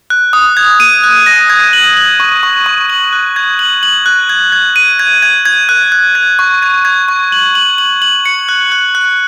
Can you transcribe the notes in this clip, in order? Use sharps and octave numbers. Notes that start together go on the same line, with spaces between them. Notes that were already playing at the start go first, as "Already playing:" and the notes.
F#6
D#6
G#6
D#7
F#6
A#6
G#6
F#7
F#7
C#6
C#6
C#6
F#7
F#6
G#6
F#7
F#7
F#6
G#6
G#6
D#7
G#6
G#6
G#6
F#6
F#6
G#6
C#6
G#6
G#6
C#6
F#7
F#7
F#7
F#7
C#7
F#6
F#6
F#6